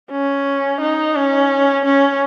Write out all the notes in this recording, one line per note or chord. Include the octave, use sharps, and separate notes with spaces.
C#4
D#4
C#4
C#4